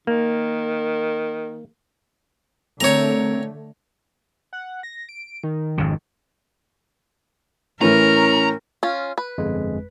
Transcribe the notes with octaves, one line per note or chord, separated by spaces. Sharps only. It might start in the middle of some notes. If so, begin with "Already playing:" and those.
D#3 A#3
D3 A3 C4 A#4 C#5 A#5
F#5
A#6
D7
D#3
G#1 F2 C#3
A2 E3 C#4 A#4 A#5
C#4 F4
B4
G1 F2 G#3